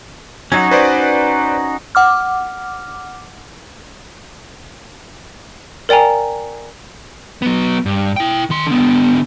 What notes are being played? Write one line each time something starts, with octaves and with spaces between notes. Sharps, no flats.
F#3 C#4 D#4 F#4 G#6
B4 C5 D5
F#5 D6 F6
A#4 D5 G5 G#5 A#5
F#3 B3
G2
E4 G5
D#3 C6
D3 B3